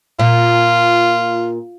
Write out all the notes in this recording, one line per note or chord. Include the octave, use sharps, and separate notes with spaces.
A#2 F4